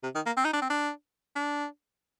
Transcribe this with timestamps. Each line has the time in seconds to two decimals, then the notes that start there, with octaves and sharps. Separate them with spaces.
0.04 C3
0.15 D#3
0.26 A#3
0.37 C4
0.45 D#4
0.54 D4
0.62 C4
0.70 D4
1.36 D4